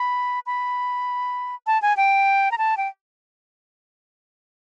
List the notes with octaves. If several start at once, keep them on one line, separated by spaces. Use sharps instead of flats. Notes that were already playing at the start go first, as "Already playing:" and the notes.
Already playing: B5
B5
A5
G#5
G5
A#5
A5
G5